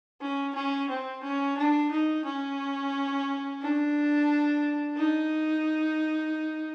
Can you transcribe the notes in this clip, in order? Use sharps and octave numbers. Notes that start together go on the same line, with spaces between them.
C#4
C#4
C4
C#4
D4
D#4
C#4
D4
D#4